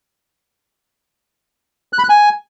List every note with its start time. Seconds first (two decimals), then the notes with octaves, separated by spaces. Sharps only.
1.93 F#6
1.98 B5
2.04 F#6
2.09 G#5